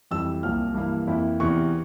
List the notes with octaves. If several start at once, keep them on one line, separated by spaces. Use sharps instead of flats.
F2 E3 G3 E6
C2 A#2 F3 A#3 F6
G2 E3 A#3
F2 E3 A#3 E4
E2 C3 E3 C#6